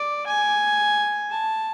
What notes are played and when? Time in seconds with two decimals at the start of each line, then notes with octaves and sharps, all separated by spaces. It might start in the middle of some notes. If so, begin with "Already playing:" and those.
Already playing: D5
0.27 G#5
1.31 A5